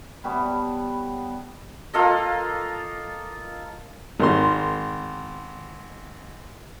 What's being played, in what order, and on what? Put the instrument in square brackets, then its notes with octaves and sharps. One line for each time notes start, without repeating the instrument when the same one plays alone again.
[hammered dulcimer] G3 B3 C#5 A5
[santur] A#3 F4 A4 D#5
[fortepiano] G#1 A#4 C6